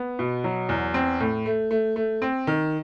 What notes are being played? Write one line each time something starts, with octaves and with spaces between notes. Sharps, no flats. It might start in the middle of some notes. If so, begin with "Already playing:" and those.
Already playing: B3
B2
F#3
E2
C4
A2
A3
A3
A3
C4
D#3